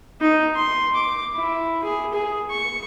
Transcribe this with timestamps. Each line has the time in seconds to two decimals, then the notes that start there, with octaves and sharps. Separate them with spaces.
0.21 D#4
0.55 C6
0.95 D6
1.35 E4
1.84 G#4
2.13 G#4
2.50 C#6